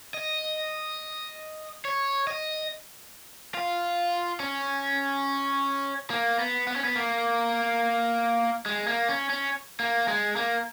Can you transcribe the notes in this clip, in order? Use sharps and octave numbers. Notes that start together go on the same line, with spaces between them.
D#5
C#5
D#5
F4
C#4
A#3
B3
B3
C#4
B3
A#3
G#3
A#3
C#4
C#4
A#3
G#3
A#3